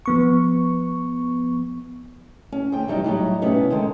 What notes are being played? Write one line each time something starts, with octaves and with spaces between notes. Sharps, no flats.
F3 B3 C#6
C#4
D2 G5
E3 F#3 G3 D#4
A2 F#3 G3 D#4
A2 C3 B3 C#4 D#4 E4
D3 D#3 G#3